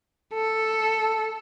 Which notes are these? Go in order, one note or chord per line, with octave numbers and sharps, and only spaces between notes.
A4